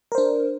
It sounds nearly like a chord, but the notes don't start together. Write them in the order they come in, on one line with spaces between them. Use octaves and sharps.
A#4 C5 D4